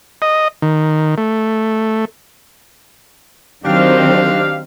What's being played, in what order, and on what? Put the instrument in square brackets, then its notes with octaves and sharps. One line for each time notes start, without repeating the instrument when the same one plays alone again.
[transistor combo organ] D#5
D#3
A3
[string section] D#3 F#3 C4 [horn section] D4 G4 F5